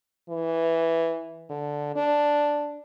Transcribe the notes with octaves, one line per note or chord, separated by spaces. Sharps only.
E3
D3
D4